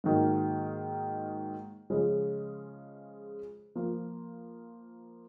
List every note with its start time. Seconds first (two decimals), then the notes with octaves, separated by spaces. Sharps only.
0.04 G#2 D#3 F#3 A#3
1.90 C#3 F3 G#3 C#4 G#4
3.75 F3 A#3 F4